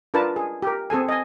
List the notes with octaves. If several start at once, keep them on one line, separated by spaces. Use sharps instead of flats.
D4 F4 A#4 B4 A5
G#4
G4 A#4
C4 G#4 A4 G#5
D#5 G#5